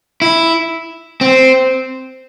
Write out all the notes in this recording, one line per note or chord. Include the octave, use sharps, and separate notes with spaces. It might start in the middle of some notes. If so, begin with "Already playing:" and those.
E4
C4